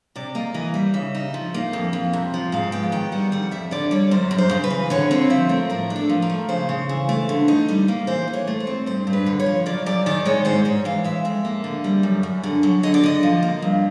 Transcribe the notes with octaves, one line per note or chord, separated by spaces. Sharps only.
C3 D5
A#3 D#5
E3 D#5
G3 E5
C#3 E5
D#4
F3
A#3
F2
F2
C3
F3
G#2 F5
B3 G5
D#3 G5
G3 F#5
F2 F#5
F2 E5
D3 D5
G3 C#5
F#2 C5
F#2
C5
C#3
B4
E3
D3 C#5
C4 C#5
F3 E5
A3 A#4
A2 A#4
D4
A4
F3
A#4
A3
C#3 C5
C#3
E3
A3
D3
D#4
G3
A#3
E3 C5
E3
C#5
A3
C5
C4
G2 C5
G2
B4
D3
C#5
F3
F#2 D5
F#2 D5
D#3 D5
G#3 C#5
G#2 C5
G#2 C#5
E3 F5
G#3 E5
F2 E5
A#3
D3
G3
F#2
F#2
D3
F#3
D3 D#5
D5
D3 D#5
F3
A#3
G2